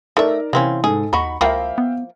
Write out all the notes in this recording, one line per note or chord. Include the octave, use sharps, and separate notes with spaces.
A3 D#4 A#4 D5 E5
C3 E3 A#3 C4 C#4
G#2 D#4 G#4 A4
D#2 D#4 F#4 B5 C#6
C#2 F3 A#3 E4 E5 F5 G5
B3